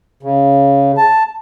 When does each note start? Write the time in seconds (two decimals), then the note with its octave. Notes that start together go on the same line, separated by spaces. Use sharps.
0.23 C#3
0.97 A5